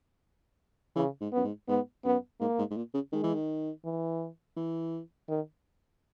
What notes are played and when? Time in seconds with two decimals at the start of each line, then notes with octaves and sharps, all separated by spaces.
0.96 C#3 E3
1.21 G#2
1.32 F#2 B3
1.44 G#2
1.68 G#2 B3
2.05 F#2 B3
2.41 G#2 A#3
2.59 G#2
2.70 G#2
2.77 A#2
2.94 C#3
3.12 D#3 G#3
3.23 E3
3.34 D#3
3.85 E3
4.56 E3
5.29 D#3